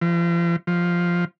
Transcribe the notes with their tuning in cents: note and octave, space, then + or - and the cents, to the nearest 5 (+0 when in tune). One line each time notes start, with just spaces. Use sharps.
F3 -40
F3 +0